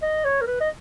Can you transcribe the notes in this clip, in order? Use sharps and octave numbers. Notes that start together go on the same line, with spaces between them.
D#5
C#5
A#4
B4
D#5